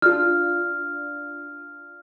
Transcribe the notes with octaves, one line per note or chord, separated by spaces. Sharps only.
D4 F4 F6